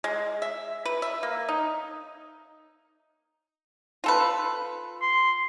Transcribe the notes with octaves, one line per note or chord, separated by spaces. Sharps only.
G#3
E5
B4
E5
A#3
D#4
F4 A4 B4
C6